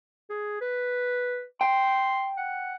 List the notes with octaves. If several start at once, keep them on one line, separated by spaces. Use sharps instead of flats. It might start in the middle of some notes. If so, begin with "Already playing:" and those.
G#4
B4
G5 C6
F#5